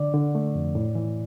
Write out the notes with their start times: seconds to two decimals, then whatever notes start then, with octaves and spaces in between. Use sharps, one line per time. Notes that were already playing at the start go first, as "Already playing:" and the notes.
Already playing: D3 D5
0.14 D3
0.35 A3
0.55 F2
0.75 A2
0.95 E3